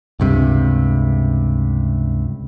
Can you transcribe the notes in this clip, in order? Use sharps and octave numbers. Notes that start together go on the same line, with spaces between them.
C#2 G2 C3